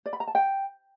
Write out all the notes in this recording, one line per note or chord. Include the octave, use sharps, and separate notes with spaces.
D5
B5
A#5
A5
G5